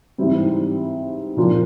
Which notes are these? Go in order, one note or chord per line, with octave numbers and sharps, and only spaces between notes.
G#2 E3 G3 C4
A#2 F3 A#3 D4 F4